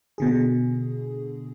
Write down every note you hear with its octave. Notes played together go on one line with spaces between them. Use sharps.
B2 D3 G#4